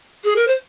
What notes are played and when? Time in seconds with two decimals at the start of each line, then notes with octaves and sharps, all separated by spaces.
0.24 G#4
0.36 A#4
0.47 C5